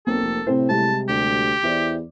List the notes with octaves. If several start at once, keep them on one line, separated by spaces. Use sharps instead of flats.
B1 A#3 C4 A4
F1
A2 C3 C4 C5
C3 G3 G#3 A5
D2 G4
E2 E4 C5 D5